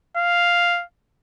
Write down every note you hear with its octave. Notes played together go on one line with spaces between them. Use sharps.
F5